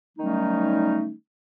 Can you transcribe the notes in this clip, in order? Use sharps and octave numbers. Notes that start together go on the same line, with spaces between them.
D#3 F#3 G3 A3 C#4 D#4